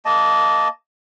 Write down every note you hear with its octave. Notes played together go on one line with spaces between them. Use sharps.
A#3 D#5 A5